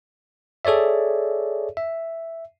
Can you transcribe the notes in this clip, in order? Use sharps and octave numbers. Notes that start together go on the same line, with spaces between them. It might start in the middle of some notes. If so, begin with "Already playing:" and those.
G#4 A4 C#5 D5 E5
E5